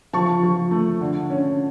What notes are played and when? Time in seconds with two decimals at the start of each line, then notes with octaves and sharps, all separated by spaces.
0.13 F3 A5 C#6
0.43 F3
0.71 A3
1.01 D3
1.30 C#4